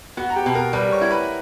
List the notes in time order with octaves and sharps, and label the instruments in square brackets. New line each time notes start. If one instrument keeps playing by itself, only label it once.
[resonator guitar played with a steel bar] B3 [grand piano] F#4 F#5
[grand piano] A#5
G4 G5
[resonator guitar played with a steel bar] B2
[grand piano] A#4 A#5
[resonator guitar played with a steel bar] G3 [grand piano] B4 B5
[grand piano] C#5 C#6
[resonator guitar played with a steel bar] E4
[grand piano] B4 B5